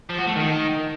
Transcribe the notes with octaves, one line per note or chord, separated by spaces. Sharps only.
F3
F#4
A3
D#3